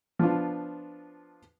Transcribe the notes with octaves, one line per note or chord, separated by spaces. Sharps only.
F3 B3 D4 F4